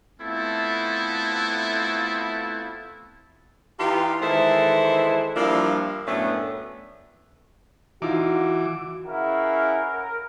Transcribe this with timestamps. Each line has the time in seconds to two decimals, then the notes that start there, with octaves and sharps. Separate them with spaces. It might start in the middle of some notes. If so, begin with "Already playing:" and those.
0.20 A3 B3 C4 E4 F4 A4
3.79 E3 D#4 F4 G4
4.21 D#3 E3 G#3 E4 A4 C5
5.36 F3 G3 A#3 D4 E4 F4
6.07 F#2 A2 A3 B3 C#4 D4
8.02 E3 D#4 F4 F#4 D6
9.06 C#4 E4 G#4 A#4 F5 F#5
9.85 A#4